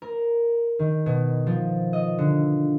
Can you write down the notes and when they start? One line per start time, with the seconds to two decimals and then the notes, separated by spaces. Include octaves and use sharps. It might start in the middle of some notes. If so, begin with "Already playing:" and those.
0.02 A#4
0.79 D#3
1.06 B2
1.47 F3
1.93 D#5
2.18 D3